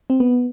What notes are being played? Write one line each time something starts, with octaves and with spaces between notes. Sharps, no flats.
C4
B3